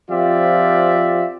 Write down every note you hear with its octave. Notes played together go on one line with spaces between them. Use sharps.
F3 C4 F4 G4 D5 E5